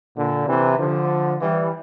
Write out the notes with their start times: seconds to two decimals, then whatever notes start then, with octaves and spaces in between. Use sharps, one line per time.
0.16 A#2 D3
0.47 C3 E3
0.79 D3 F3
1.41 E3 G3